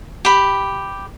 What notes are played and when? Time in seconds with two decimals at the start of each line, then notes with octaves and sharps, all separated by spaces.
0.25 G4 B5